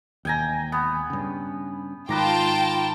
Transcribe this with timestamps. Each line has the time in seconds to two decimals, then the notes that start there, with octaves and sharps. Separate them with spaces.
0.25 E1 D#2 G5 G#5 A#5
0.72 B3
1.10 G2 C#3
2.09 G#2 D#3 F4 B4 G5 A5 A#5 D6